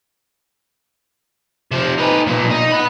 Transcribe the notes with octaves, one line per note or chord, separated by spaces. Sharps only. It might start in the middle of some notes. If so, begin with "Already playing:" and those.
C3 F3
D#4 B4
B1 A#2
D#4
F#5 B5